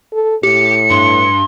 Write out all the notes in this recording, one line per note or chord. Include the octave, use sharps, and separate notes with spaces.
A4
A2 G4 C#7
G2 C6